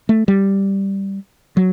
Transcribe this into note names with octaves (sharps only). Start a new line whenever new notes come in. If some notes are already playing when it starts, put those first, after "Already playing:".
A3
G3
F#3